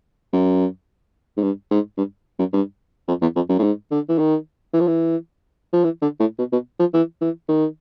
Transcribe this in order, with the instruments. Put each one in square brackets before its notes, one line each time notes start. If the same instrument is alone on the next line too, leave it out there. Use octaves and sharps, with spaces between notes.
[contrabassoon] F#2
G#2
G2
G#2
G2
F#2
G2
F2
E2
F2
F#2
A2
G#2
D3
E3
D#3
E3
F3
E3
F3
E3
D3
A2
B2
B2
F3
E3
E3
D#3